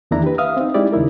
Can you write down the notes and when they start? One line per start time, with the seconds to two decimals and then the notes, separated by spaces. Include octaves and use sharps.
0.11 E2 D#3 A#3 D4 E4 A#5
0.23 G4 B4
0.38 E5 F5 D#6 F6
0.57 C4 D#4
0.74 G#3 D#4 E4 G4 D5
0.92 D#2 C#3 D#4 E4 A#4